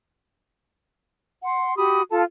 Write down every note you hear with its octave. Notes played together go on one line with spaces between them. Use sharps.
F#5 C6
F#4 G4 B5 D#6
F4 A4 A5